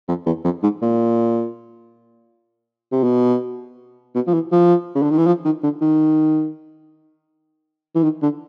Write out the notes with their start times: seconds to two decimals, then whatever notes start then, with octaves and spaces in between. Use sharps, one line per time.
0.08 F2
0.26 E2
0.44 F2
0.63 G#2
0.82 A#2
2.92 C3
3.04 B2
4.15 B2
4.27 F3
4.34 E3
4.52 F3
4.95 C#3
5.03 D3
5.11 D#3
5.18 E3
5.27 F3
5.45 D#3
5.63 D3
5.82 D#3
7.95 E3
8.03 D#3
8.22 D3